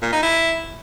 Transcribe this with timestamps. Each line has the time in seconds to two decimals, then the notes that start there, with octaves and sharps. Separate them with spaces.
0.02 A#2
0.13 D#4
0.23 E4